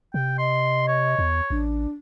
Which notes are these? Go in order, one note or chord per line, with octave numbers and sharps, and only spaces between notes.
C3 G5
D#5 C6
C#5
E2
A1 D4